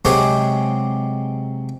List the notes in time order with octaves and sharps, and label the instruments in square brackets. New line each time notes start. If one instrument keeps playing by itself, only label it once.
[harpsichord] C3 F#3 G#3 C4 G4 G#4